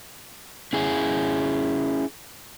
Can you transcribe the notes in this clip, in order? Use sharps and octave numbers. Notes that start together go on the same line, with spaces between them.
C#4 E4 G#4